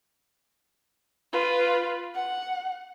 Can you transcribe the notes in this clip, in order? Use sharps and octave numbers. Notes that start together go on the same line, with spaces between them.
F4 B4
F#5